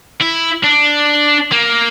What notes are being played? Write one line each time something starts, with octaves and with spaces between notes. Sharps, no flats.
E4
D4
A#3